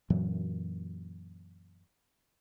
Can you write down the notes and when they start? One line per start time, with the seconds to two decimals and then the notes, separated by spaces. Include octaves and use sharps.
0.10 F#2 A#2 E3 F#3